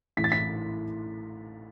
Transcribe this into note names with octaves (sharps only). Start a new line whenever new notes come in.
A1 A2 E3 B6
A6
B6